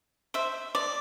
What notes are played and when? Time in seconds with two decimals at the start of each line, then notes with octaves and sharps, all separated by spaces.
0.34 C5 E5
0.75 D5